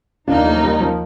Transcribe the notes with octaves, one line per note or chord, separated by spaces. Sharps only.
D#2 D#3 A#3 D4 D#4 F4
F3 A3
F3
G3
F3